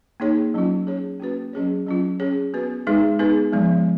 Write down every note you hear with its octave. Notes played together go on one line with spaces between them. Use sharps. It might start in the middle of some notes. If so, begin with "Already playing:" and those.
A#3 D#4 G#4 C#5
F#3 C#4 F4
C#4 G#4 C#5
A#3 C#4 F#4 B4
F#3 C#4 G#4 C#5
F#3 C#4 F4
C#4 G#4 C#5
B3 F#4 B4
G#3 D#4 G#4 B4
B3 D#4 G#4 B4
F3 G#3 B3